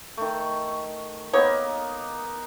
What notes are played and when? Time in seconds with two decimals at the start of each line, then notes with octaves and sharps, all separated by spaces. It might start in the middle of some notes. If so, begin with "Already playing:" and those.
0.17 D#3 A3
1.33 A#3 B3 D#4 C#5